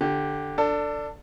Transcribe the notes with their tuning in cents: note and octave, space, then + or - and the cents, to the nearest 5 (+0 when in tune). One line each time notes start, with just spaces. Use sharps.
D3 +0 G4 +0
D4 +0 A4 +25